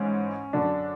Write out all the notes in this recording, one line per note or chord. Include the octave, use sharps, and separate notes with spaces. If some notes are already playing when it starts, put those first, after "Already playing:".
Already playing: G#2 E3 C#4
F#2 D3 D4